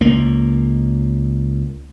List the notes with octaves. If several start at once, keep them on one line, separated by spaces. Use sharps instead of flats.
C#2 A#3